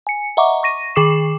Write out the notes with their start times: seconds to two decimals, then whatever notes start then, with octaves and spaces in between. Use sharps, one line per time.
0.07 G#5 C#7
0.37 D#5 E5 F#5 A#5 C#6 D6
0.63 C#6 A#6 D#7
0.96 D#3 G#4 D6 C7 E7